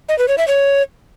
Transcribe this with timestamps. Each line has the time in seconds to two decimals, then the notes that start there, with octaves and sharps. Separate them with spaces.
0.09 D#5
0.18 B4
0.28 C#5
0.38 E5
0.48 C#5